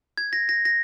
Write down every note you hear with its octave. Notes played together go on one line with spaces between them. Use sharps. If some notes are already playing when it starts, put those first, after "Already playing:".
G#6
A#6
A#6
A#6